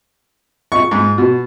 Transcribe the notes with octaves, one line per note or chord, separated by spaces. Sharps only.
C#6
G#2
B2